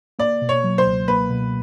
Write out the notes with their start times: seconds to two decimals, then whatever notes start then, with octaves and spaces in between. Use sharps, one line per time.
0.19 A#3 D5
0.42 B2
0.49 C#5
0.64 F#3
0.78 C5
0.85 C#2
1.08 A#3 B4
1.30 B2